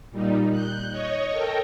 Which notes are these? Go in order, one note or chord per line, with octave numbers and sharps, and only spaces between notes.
A#2 G3 D#4
F#6 G6
C#5 D#5 C#6
A4 A#4 G5 A#5